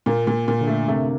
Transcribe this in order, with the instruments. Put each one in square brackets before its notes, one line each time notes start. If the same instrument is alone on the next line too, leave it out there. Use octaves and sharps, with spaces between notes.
[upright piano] A#2 [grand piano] A#3
[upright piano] A#2
A#2
[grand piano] D3
[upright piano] A3
[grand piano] C3 [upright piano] A3